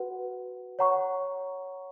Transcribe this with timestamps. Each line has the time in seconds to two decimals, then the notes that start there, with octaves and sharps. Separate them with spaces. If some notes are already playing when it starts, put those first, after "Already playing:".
Already playing: F#4 B4 F#5
0.79 C#5 F#5 A#5 C#6